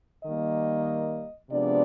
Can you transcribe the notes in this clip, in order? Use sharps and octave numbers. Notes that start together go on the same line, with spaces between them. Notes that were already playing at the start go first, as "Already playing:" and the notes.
D#3 G3 A#3 D#5
C3 F3 G#3 B3 D4 D5